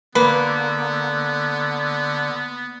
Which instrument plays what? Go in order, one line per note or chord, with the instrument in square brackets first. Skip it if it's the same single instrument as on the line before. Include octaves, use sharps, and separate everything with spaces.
[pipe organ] D3 [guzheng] A#3 [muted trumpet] B3 [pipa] B4